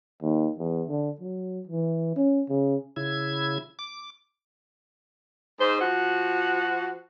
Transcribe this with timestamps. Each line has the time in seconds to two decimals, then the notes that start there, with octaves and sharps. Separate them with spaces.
0.21 D#2
0.58 E2
0.88 D3
1.20 F#3
1.67 E3
2.16 C#4
2.49 C#3
2.96 C#3 E4 G#6
3.79 D6
5.60 G#2 C5
5.80 F3 F#4